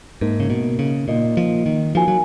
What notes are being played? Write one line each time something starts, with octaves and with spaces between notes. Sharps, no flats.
G#2 A#3 D#4 A#4 D#5
C#3
B2
C#3
A#2 A#3 D#4 A#4 D#5
F3
D#3
F3 D#4 F#4 A#4 F5 G#5
F#3